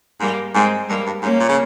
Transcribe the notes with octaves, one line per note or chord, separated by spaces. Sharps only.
G#2 G3 A#3
G#2 G#3 C4
G2 G3 A#3
G2
G#2 A#3 C#4
A#2
C#3